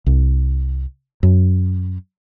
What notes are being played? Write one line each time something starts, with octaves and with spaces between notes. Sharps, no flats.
C2
F#2